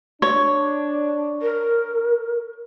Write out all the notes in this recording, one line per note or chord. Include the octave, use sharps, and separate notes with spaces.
D4 C#5
A#4